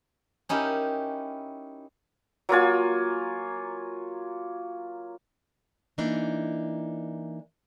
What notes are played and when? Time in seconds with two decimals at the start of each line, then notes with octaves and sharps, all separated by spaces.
0.49 C#4 D#4 E4 G4 A#4
2.49 F#3 A#3 F4 G#5
5.98 E3 A#3 D4 D#4